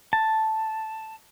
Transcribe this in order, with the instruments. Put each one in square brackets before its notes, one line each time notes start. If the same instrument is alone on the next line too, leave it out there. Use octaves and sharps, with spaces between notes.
[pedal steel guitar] A5